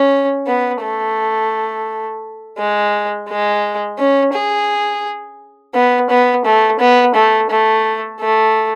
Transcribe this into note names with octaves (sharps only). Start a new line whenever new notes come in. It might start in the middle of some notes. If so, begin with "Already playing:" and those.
Already playing: C#4
B3
A3
G#3
G#3
C#4
G#4
B3
B3
A3
B3
A3
A3
A3